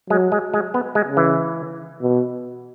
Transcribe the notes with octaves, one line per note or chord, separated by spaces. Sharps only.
F#3 G#3
G#3
G#3
B3
G#3
C#3
E3
B2